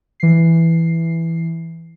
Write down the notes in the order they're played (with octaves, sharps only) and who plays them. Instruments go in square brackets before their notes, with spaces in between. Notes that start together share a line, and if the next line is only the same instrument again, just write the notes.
[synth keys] E3 C7